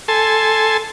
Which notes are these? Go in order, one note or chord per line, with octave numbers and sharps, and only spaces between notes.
A4 G#5 A5 C6